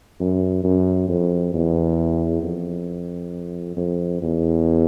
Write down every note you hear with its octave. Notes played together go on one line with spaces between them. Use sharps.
F#2
F#2
F2
E2
F2
F2
E2